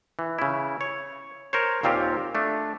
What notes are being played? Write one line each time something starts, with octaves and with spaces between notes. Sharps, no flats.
E3
C#3 E4
C#5
A#4 C5 C#5
D#2 A#2 C4 F4 G4
A3 D4